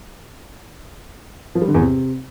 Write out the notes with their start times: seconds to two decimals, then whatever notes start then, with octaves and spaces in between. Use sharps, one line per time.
1.55 F3
1.62 G3
1.68 D3
1.74 E2
1.81 C3